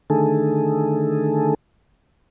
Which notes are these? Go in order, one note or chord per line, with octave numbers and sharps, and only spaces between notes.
D3 D#3 A3 G#4 A4